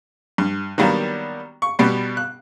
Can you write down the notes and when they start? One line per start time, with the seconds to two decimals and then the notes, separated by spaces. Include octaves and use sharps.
0.38 G2
0.78 D#3 F#3 G3 A#3 B3 D4
1.62 C#6
1.79 B2 G3 B3
2.17 F#6